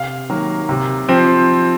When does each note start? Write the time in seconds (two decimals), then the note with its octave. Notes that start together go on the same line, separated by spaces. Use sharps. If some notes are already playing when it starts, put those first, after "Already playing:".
Already playing: C3 F5
0.30 D#3 F#3 A#3
0.69 C3
1.09 F3 C4